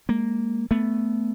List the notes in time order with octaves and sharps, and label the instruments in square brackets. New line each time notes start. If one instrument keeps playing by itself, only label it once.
[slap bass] G#3 A#3
A3 B3